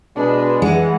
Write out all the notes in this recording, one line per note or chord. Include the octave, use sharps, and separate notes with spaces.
B2 G#3 D4 B4
E3 G#3 F#5